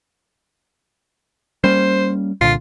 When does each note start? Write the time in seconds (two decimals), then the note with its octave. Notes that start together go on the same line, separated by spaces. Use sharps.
1.64 G3 A#3 C#4 C5
2.41 C2 A#2 D3 F4